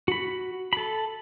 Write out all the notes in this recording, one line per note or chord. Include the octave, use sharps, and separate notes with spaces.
F#4 B5
A4 B5